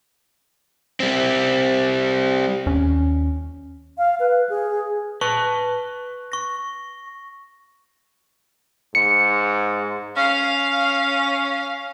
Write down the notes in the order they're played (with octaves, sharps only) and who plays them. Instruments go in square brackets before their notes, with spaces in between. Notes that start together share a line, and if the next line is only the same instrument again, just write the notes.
[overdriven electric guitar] G3 C4
[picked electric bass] D#2 C#4
[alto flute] F5
B4
G#4
[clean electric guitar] B4 A5 [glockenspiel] C#6
[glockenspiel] C#6 A#6
[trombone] G#2 [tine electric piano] C#7
[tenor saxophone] C#4 [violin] F5